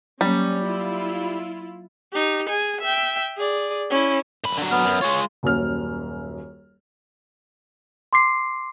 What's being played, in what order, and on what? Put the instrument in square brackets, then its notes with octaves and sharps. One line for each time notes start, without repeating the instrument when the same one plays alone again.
[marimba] F#3 A#3 [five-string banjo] G3 [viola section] C#4
[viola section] E4 F4
[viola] D#4 G4
G#4 G#5
E5 G5
G#4 D5
C#4 E4
[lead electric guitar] F#2 B5
D3 F#3
[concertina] B3 F6
[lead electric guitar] F#2
[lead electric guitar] G#3 F4 [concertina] C#5
[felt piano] D#1 F#2 F6
[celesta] C6 D6 C7